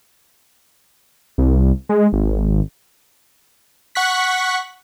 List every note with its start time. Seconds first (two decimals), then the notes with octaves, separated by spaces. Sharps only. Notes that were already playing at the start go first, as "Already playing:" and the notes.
1.38 C2
1.89 G#3
2.12 G#1
3.95 F#5 C#6 F#6 B6